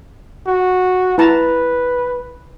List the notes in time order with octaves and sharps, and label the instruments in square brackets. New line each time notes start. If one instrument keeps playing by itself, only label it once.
[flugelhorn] F#4
[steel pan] E4 A5 A#5 [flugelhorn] B4